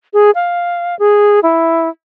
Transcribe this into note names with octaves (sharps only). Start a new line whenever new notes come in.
G#4
F5
G#4
E4